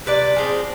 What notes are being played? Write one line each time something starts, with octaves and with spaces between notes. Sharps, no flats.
C3 B4 D5
F3 G#3 C4